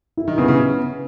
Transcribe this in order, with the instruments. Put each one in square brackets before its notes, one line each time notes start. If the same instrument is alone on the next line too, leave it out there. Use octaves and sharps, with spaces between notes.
[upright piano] E4
[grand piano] D#3
[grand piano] C#3 [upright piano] B3
[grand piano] C#3